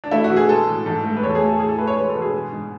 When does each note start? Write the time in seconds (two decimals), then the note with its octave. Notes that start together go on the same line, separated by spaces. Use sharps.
0.04 D4
0.11 A3 E4
0.24 F#4
0.30 B2
0.36 G#4
0.49 G#3 A4
0.67 A2
0.86 G#2 A4
1.04 A3
1.17 B4
1.22 E2 C#5
1.29 A4
1.35 G#4
1.41 A3
1.47 A4
1.59 A2 G#4
1.69 A4
1.79 A3 B4
1.87 C#5
1.96 G#3 B4
2.09 A4
2.15 B2
2.22 G#4
2.34 G#3
2.52 G#2